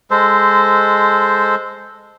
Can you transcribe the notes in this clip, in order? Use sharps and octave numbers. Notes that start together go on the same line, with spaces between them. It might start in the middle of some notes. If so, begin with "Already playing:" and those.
G#3 A4 C5